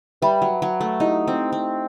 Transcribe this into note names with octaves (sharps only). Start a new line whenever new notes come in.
G3 B4 E5 B5
F#3
F#3
A3
D#4 E4 G4 D#5
C4
C4